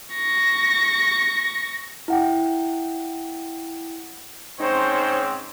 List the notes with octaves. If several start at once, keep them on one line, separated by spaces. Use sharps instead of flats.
C#6 A#6
E4 F#5 G5
G#2 C4 C#4 D#4 C5 C#5